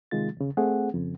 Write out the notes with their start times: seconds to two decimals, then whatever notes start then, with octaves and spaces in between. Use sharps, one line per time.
0.11 C3 D#3 G#3 F4 A6
0.37 D#2 C#3
0.57 A3 C4 G#4 F#5
0.94 F2 C#3